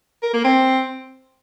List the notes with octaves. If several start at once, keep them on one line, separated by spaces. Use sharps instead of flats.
A#4
A#3
C4